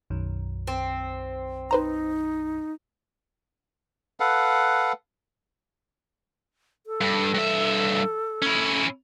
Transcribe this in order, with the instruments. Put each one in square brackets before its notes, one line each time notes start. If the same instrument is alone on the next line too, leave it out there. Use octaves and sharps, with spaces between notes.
[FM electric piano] B1 F#2 D#3
[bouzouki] C4
[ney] D#4 [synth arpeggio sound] B4 C5 A#5
[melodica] A4 B4 F5 F#5
[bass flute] A4
[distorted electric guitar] G2
G2 E5
C#4 E4